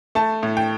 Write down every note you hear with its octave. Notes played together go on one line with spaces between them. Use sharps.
A3 A5
A2
G5